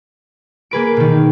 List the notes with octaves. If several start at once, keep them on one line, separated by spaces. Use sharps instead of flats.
A#3 G#4 B4 D7
B2 D#3